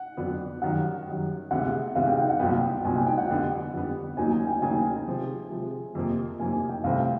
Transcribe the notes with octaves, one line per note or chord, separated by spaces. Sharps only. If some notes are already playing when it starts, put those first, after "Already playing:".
Already playing: F#5
F2 D3 F#3 B3 D4
F#2 D#3 G3 F#5
F#2 D#3 G3
D2 C3 E3 G#3 B3 F#5
D2 C3 E3 G#3 B3 F5
G5
G5
F#5
C2 A#2 F#3 B3 G5
C2 A#2 F#3 B3 G#5
G5
G5
F#5
F2 D3 G3 B3
F2 D3 G3 B3
D#2 C#3 F#3 A#3 D#4 G#5
G#5
G5
D#2 C#3 F#3 A#3 D#4 G#5
C3 F3 G#3
C3 F3 G#3
F2 C3 F3 A#3
F2 C3 F3 A#3 G#5
G5
C2 C3 E3 A3 C4 F5